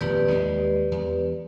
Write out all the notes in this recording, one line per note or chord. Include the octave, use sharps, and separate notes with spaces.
D#1 G#1 F2 G4 B4 D5
D#2 G#3
E2